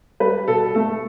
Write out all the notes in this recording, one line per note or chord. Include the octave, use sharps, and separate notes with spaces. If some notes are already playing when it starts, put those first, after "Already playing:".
G3 B4
B2 A4
A3 A4